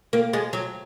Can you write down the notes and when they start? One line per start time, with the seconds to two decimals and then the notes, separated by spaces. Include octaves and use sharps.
0.13 A#3
0.33 G#3
0.53 F#3